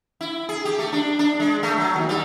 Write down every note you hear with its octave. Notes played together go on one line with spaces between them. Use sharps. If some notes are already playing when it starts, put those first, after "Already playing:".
E4
G#4
G4
A3
D4
D4
G#3
A3
F#3
D#2
G3